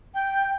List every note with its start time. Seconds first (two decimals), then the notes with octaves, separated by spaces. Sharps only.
0.14 G5